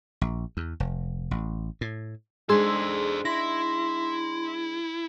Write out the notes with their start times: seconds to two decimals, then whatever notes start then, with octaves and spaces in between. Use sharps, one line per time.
0.21 A#1
0.57 E2
0.80 F1
1.31 A1
1.81 A2
2.49 G#3 D4 D#4 G#4 A4 C5 C6 E6
3.25 E4 C6 A#6